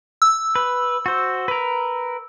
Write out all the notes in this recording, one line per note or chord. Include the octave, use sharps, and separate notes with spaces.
E6
B4
F#4 C5
A#4 B4